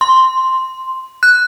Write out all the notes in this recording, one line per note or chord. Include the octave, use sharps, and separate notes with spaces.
C6
F#6